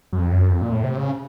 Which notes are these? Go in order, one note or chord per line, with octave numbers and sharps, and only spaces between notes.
F#2
F2
F#2
F2
A#2
A2
C3
C#3